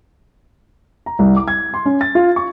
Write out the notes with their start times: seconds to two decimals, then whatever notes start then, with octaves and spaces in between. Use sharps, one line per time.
1.06 A#5
1.19 C2
1.36 D6
1.48 G#6
1.74 C6
1.86 C#4
2.01 A6
2.15 F4
2.36 C#6